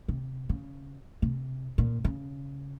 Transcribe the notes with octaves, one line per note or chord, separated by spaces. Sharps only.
C3
C#3
C3
A#2
C#3